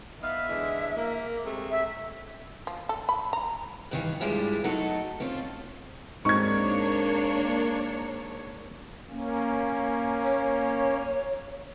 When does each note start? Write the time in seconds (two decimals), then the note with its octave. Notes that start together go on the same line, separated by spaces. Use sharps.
0.21 B3 D#4 E5 F5
0.48 D3 E3 G#3
0.96 A#3
1.44 C3 G#3 A3
1.71 E5
2.67 F3
2.89 A4
3.09 B5
3.33 A#5
3.91 G2 D#3 E3
4.20 G2 G3 G#3 E4 F4
4.64 F#3 A3 D#4 A4
5.20 A3 C4 C#4 F4
6.25 G#2 A#3 C4 D4 D#4 C#5 C#6 G#6
9.09 A#3 C#4
10.23 C#5